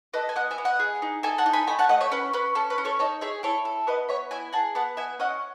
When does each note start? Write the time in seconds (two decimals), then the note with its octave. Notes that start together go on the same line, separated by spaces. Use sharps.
0.14 A4 B4 D#5
0.29 G#5
0.36 B3 D#5 F#5
0.51 E5 G#5
0.58 B3
0.65 D#5 F#5
0.80 G#4
1.02 D#4
1.23 A4 E5 G#5
1.38 F#5 A5
1.46 D#4
1.53 G#5 B5
1.67 A3 G#5 B5
1.79 F#5 A5
1.89 A3 D#5 F#5
2.01 C#5 E5
2.12 C#4 B4
2.33 C#4 B4
2.55 C#4 A4
2.70 B4
2.78 C#4
2.85 A4 C#5
2.99 D#4 A4 C#5
3.21 G#4 C#5 E5
3.43 E4 A4 C#5
3.65 A4
3.87 B3 B4 D#5
4.09 B3 C#5 E5
4.31 E4 E5 G#5
4.53 G#4 F#5 A5
4.75 B3 F#5 A5
4.97 B3 E5 G#5
5.19 C#4 D#5 F#5